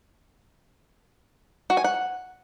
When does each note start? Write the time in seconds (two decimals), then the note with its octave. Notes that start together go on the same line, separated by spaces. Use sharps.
1.70 F#4
1.77 G#5
1.84 F#5